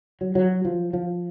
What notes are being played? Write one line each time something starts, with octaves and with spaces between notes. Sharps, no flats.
F#3
F#3
F3
F3